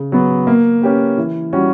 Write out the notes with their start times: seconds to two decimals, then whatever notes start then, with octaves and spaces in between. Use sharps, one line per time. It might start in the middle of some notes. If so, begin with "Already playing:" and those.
Already playing: C#3
0.12 F#3 B3
0.47 A#3
0.82 C#4 G4 B4
1.18 E3
1.53 G3 C#4 F#4